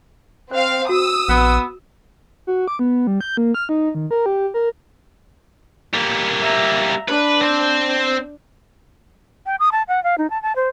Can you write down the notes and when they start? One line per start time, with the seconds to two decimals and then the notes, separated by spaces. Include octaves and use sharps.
0.51 C4 C5 F5
0.89 F#4 D#6 E6
1.29 A#1 B3
2.47 F#4
2.68 D6
2.79 B3
3.07 G3
3.21 G6
3.37 A#3
3.54 F6
3.69 D#4
3.95 D#3
4.11 A#4
4.26 G4
4.54 A#4
5.94 G3 A#3
6.40 E5 A#5
7.08 D4 B4
7.41 C4 C5
9.46 G5
9.60 D#6
9.72 A5
9.88 F#5
10.04 F5
10.18 D#4
10.30 A5
10.43 A5
10.56 C5